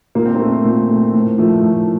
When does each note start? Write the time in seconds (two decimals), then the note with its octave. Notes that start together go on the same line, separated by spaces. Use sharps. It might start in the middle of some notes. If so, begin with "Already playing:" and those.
0.15 A#2 A#3
0.25 C4
0.35 A#3
0.40 A3
0.65 A#2
0.90 A3
1.13 A2
1.38 F3 A3
1.63 A2